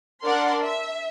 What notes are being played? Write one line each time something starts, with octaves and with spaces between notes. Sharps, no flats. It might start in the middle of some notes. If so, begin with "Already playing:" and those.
D4 A#4 D5 F#5 C6
E5